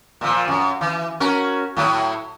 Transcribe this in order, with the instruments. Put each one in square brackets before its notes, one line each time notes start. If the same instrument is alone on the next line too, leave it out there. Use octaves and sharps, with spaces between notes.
[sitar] A#2 F3
F#2
E3
C#4 F#4 A#4
A2 F#3 E4